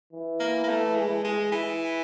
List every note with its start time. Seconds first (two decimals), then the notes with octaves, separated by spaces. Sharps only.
0.13 E3
0.40 A#3
0.63 A#3
0.68 A3
0.95 G#3
1.24 G#3
1.52 E3